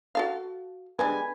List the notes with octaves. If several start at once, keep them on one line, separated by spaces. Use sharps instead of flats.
F#4 A4 F5
D3 G3 G#3 B4 G#5